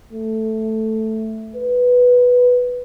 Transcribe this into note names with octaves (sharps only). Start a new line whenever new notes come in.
A3
B4